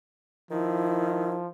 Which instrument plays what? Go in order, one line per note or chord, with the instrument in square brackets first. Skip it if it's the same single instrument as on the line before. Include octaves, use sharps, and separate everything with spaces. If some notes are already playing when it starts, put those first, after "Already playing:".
[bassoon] D#3 [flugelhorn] F3 [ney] E4